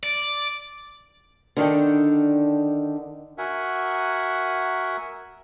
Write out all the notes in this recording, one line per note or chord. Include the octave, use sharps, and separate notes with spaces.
D5
D3 D#3 D4 G5
F#4 A#4 E5 F#5 G#5